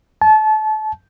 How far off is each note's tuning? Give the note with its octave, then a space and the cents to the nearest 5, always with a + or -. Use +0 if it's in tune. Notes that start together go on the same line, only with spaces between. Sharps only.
A5 -30